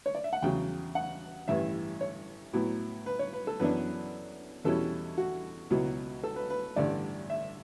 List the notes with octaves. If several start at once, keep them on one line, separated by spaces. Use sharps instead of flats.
C#5
D5
E5
F#5
E2 C#3 F#3 G5
F#5
A1 G2 E3 E5
C#5
A2 F#3 B3 E4
B4
C#5
B4
A4
F#2 E3 B3 D4 B4
E2 B2 G3 C#4 E4 A4
F#4
C#2 B2 F#3 B3 E4
A4
B4
B4
A1 G2 D3 D5
E5